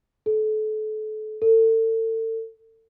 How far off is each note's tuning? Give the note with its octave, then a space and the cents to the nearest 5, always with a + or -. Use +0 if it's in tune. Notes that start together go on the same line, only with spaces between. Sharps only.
A4 -35
A4 +35